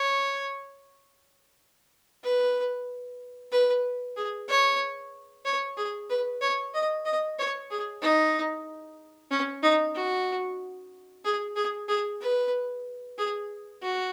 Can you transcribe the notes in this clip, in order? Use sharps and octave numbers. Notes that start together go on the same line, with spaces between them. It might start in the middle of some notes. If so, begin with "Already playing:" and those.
Already playing: C#5
B4
B4
G#4
C#5
C#5
G#4
B4
C#5
D#5
D#5
C#5
G#4
D#4
C#4
D#4
F#4
G#4
G#4
G#4
B4
G#4
F#4